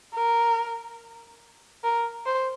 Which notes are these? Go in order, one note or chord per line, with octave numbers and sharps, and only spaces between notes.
A#4
A#4
C5